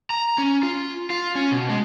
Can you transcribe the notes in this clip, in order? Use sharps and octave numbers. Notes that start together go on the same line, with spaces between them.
A#5
C#4
F4
F4
C#4
B2
G#3